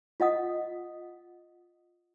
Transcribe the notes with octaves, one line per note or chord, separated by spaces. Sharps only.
F4 D#5 F#5 D#6